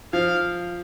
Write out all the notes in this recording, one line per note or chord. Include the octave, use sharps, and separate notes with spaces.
F3 F5